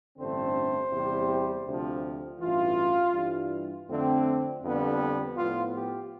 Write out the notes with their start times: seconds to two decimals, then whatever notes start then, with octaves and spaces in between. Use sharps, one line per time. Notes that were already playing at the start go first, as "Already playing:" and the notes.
0.18 A1 G2 D3 A3 C4 C5
0.92 E2 C3 G3
1.66 D2 C3 F3
2.40 A1 G2 E3 F4
3.15 G2 E3 G3
3.89 F2 D3 A3 C4
4.63 F2 D3 G3 B3
5.37 A2 F3 B3 F4
5.74 G4